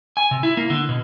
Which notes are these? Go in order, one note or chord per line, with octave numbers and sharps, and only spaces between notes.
G#5
C3
E4
A#3
D3
B2